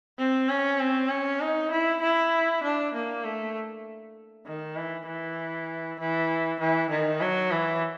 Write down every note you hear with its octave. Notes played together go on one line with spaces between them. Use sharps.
C4
C#4
C4
C#4
D#4
E4
E4
D4
A#3
A3
D#3
E3
E3
E3
E3
D#3
F#3
E3